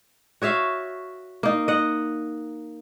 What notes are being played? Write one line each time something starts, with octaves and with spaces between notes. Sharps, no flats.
F#4 C#5 E5 F5
A#3 D#4
D#5 F#5